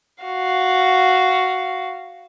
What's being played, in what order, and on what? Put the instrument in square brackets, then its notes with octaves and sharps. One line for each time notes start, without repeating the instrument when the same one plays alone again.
[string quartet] F#4 F5